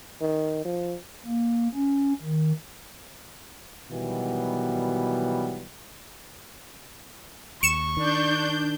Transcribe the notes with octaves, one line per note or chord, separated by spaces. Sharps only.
D#3
F3
A#3
C#4
D#3
B2 D#3 E3 F#3 G3 B3
D#2 C#6 C#7 E7
D#3 D4 G6